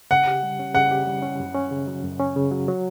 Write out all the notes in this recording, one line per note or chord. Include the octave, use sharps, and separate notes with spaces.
C#3 F#5
G4
G3
C#4
C#3 F#5
G4
G3
C#4
F#2
C#4
C#3
F#3
F#2
C#4
C#3
F#3
F#3